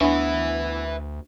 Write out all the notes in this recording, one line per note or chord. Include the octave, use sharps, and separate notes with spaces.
D2 E3 B3 D4 B4 E5